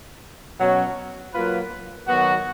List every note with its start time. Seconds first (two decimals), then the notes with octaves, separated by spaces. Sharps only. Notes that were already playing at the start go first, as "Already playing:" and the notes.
0.59 B2 F#3 C#4 F#4
1.33 F#3 A#3 F4 B4
2.08 D#3 F#3 B3 F#4